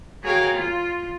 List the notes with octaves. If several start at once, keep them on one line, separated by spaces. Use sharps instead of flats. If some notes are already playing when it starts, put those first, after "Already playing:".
F#4 G#4 A#4 C#5 F5 G5
F4